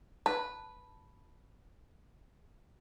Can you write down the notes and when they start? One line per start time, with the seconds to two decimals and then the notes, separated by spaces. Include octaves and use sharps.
0.26 B4 A5